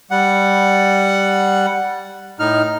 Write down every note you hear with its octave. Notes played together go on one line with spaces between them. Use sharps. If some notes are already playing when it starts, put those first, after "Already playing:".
G3 F#5
A2 D#4 F6